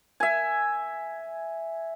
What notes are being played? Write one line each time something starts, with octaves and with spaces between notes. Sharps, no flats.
E5 G#5